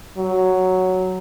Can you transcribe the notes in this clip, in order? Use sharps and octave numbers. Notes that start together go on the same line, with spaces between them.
F#3